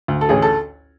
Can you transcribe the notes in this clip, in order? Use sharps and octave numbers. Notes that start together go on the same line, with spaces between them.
D2
A4
A1 G#4
A4